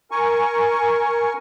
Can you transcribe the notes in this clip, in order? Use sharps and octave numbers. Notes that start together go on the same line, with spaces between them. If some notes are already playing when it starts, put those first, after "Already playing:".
A#4 G#5 C#6